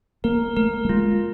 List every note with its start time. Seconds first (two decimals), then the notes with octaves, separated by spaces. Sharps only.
0.24 A#3 A#4
0.56 A3 A#4
0.85 A3
0.89 G#3 F4